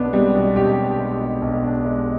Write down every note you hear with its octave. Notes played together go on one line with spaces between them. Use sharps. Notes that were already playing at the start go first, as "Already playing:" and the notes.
Already playing: B1 B3 D4
G3 G#3
B2
B1 G4
D4
G#3
B2
B1
D4
G#3